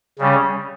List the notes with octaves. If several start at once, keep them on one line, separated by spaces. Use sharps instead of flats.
C#3 G3 C#4